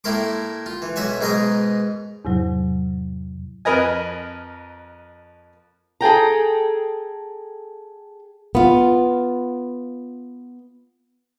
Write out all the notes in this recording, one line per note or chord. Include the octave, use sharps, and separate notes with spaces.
A2 A#3 E4 A#4 C6 D6
F4
E3
B1 F#4 C#5 E5 F#5 G#5
G#2 B2 G#4 A#4 D#5 A#5
E2 G#2 C3 F#3
F2 A#4 B4 D#5 G#5
G#4 A4 G5 A#5
B3 F4